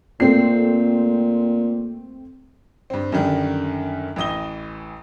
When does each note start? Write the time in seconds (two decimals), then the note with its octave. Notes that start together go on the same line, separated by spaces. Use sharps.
0.20 A#2 A3 C4 C7
2.90 G2 C4
3.12 F#2 D3 D#3 G3
4.16 A1 E3 D#6 A#6 G7